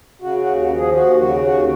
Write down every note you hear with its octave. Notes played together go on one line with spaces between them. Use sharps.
C#3 F#4
F#4
D#2
F#4
F3
G#4
D#2 F#4
C#3 F#4
D#2 F#4